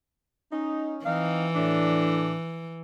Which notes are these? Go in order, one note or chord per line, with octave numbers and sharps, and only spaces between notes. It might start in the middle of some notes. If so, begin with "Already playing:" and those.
C#4 D#4
E3 C4 D#4 F5
A2 D4